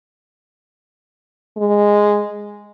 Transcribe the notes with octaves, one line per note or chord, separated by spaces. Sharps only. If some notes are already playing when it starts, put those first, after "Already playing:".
G#3